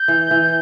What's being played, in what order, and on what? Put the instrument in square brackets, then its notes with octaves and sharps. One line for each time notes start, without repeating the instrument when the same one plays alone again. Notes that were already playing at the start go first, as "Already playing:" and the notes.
Already playing: [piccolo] G6
[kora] E3
E3